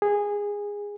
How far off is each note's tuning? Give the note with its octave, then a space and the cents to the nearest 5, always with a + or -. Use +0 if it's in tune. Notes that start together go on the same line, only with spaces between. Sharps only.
G#4 -15